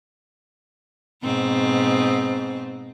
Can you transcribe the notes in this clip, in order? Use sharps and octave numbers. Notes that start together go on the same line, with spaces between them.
G#2 B2 C4